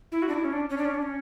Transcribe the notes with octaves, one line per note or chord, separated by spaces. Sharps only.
E4
F#4
D4
E4
C#4
D4
C#4
D4
C#4
D4
C#4